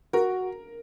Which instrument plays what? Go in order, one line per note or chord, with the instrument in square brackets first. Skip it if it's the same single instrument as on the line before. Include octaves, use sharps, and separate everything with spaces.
[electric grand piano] F#4 [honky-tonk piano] A#4